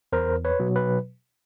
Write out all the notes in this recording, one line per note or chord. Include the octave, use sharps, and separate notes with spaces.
E2 A#4 C5
B4 C#5
B2 F#3
B4